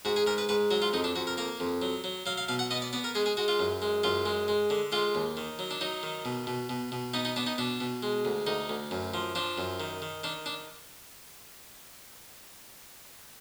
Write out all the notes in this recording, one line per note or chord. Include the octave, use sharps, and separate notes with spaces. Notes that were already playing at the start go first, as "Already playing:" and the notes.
G#2 F#4
G#4
G#2 A#4
B4
G#2 B4
F#3 F#4
F4
F2 D#4
D4
F2 F#4
A#4
A#3 A#4
F2
F#3
F#3
F#3 F5
F5
B2 F5
F#5
B3 D#5
D5
B3 D5
A#4
G#3 G#4
G#4
G#3 F#4
F4
F#2
G#3
F#2 F4
G#3
G#3
D3
G#3 F4
D#2
D#3
F#3
D4
F#3 D#4
D#3
B2
B2
B2
B2
B3 D#4
D#4
B3 D4
D#4
B2 D4
B2
G#3
D2
D2 D#4
D2
F#2
F3
F3 D4
F#2
D#3
D#3
D#3 D4
D4